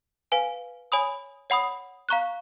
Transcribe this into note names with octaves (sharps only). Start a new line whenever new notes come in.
B4 F5 G#5
C#5 G#5 B5 D#6
C#5 F#5 B5 D#6
F5 A#5 C#6 F#6